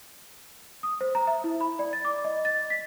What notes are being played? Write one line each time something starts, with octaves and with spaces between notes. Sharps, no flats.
D#6
C5
A#5
E5
E4
B5
D5
A6
D6
D#5
A6
B6